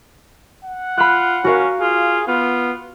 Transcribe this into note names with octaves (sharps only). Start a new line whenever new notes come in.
F#5
F4 B5 F#6
C#4 F#4 A#4 F5
F4 G#4
B3 F4